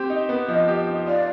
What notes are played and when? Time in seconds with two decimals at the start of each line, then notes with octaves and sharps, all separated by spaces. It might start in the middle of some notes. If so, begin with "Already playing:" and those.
Already playing: C4 G4
0.10 D#4
0.29 B3
0.48 F3 D#5
0.68 G4
0.88 D#4
1.07 F4 D5